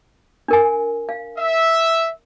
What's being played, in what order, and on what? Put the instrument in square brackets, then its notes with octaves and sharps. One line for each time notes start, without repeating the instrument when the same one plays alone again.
[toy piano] D4 A#4 G#5
F5
[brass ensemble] E5